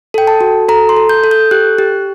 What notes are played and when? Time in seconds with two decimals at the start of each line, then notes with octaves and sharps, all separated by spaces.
0.14 A4 G5
0.27 A5
0.41 F#4
0.69 A4 A#5
0.89 C6
0.96 A4
1.09 G6
1.24 A4
1.31 G6
1.51 G4 F#6
1.78 G4